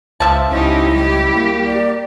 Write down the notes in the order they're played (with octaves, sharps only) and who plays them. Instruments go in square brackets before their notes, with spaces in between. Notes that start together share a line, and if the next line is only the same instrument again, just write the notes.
[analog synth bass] C#2 [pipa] F3 E5 A5
[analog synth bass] C#2 [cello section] C#4 D#4 G4 [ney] E4
[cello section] G3 G4
[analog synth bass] A#3
[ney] D5